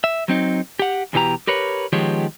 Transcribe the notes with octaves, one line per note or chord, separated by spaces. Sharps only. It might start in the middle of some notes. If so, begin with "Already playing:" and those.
E5
F#3 C4 D#4
G4 F#5
E2 B2 E3 G4 A#5
G4 A#4 B4 C#5
D#3 F3 G#3 B3 G4 C#5